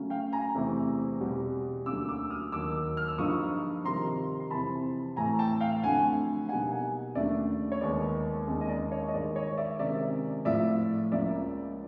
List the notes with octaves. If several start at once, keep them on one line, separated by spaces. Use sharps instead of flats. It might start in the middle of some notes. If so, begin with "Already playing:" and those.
Already playing: C#3 F#3 A3 C#4
F5 G5
G#5 A#5
E2 C3 E3 A3 C4
E2 B2 G3
D2 D3 F#3 A#3 C#4 D6 E6
D6 E6
D#6 F6
D#2 D#3 F#3 D6 E6
F6
E6
G2 D3 F3 A#3 D#4 C#6 D#6
C3 D#3 G3 A#5 C6
C6
F2 C3 E3 A5 B5
A2 E3 A3 G#5 A#5
G5 A5
F5 G5
F2 D3 F#3 A3 F#5 G#5
B2 G3 A#3 D#4 F#5 G#5
F#5 G#5
D#2 C#3 F#3 A3 D4 D5 E5
C#5
D#2 D#3 G#3 B3 D5
D#2 D#3 G#3 C#4
D#5
D5
C#5 D#5
D#5
G2 D#3 G#3 D5
C#5 D#5
D5 E5
C3 D#3 G#3 C#4 D5 E5
A2 F3 A3 D5 E5
C#2 C#3 F3 A#3 D5 E5